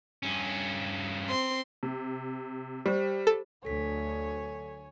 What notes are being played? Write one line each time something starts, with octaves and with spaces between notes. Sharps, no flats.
G2 C#4
C4 C6
C3
G3 G4 C5
A4
D2 F#3 A4 C#5 G#5 B6